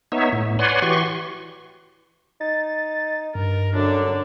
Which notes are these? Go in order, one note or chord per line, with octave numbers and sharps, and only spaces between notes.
B3 D#4 C#5 E5
A2
B4 C#5 D5 F#5 G#5 C6
E3 F#4 G4 C6 C#6
D#4 A6
G2 A#4
F#2 D3 D4